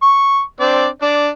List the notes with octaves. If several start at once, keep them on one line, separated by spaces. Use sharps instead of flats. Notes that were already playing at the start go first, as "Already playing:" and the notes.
C#6
C4 D4 D5
D4 D5